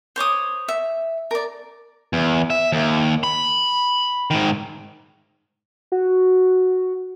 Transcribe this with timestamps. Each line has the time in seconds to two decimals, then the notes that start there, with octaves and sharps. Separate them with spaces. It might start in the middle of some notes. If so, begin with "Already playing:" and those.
0.16 C5 C#5 D6 D#6
0.68 E5
1.31 A#4 D5
2.13 E2
2.50 E5
2.72 D#2
3.23 B5
4.31 G#2 D#3
5.92 F#4